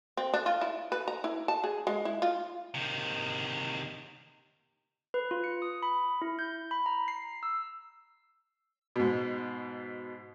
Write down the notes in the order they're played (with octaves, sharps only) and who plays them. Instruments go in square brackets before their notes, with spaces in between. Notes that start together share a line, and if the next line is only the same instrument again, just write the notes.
[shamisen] C4
D4
F4
E4
B4
A#5
E4
A5
G#4
G#3
E4
F4
[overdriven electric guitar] C3 D#3
[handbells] B4
F4
C#7
D#6
B5
E4
G6
B5
A#5
C7
E6
[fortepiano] G#2 B2